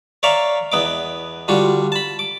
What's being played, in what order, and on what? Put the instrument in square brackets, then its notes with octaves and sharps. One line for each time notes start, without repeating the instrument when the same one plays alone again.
[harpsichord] C#5 D5 E5 F5 A#5
E2 B3 D#5 D6
D3 G3 F4 F#4
A5 B5
D6